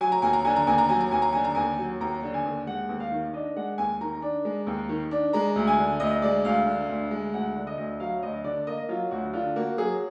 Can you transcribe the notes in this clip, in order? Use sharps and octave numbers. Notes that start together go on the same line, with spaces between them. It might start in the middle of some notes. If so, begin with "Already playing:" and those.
F#3 G#5
A#5
D#2 G#5
A#5
D3 G#5
A#5
D#2 G#5
A#5
F#3 G#5
A#5
D#2 G#5
A#5
D3 G#5
A#5
D#2 G#5
F#3
D#2 A#5
D3
G#5
D#2
G#3 F#5
D#2
F5
D#3
D4 D#5
G#3 F#5
D#2 G#5
D#3 A#5
D4
G#3
D#2
D#3
D4
G#3 A#5
D2
G#5
D3
D2 D#5
G#3 D5
D2 F5
D3
D2
G#3
D2 F#5
D3
D#5
D2
F#3 F5
D2 D#5
D3 D5
A#3 D#5
F#3 F4
D2 F#4
D3 F4
A#3 F#4
F#3 G#4